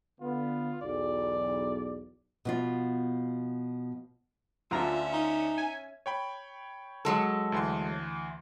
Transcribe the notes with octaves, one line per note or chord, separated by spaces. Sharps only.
D3 B3 F4
B1 E2 D5
B2 F3 F4
D2 D3 C#4 F4 E5 A#5
D#4
G#5
C#5 G5 B5
F#3 G#3 A4
D2 E3 C6